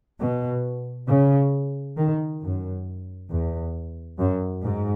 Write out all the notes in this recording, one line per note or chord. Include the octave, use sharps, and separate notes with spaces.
B2
C#3
D#3
F#2
E2
F#2
G#2